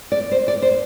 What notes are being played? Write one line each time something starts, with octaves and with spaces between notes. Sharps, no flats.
D5
C5
D5
C5